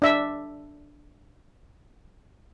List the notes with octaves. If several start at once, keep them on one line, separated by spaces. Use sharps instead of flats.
D4 E5